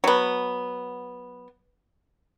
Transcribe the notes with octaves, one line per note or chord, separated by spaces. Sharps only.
F#3 B3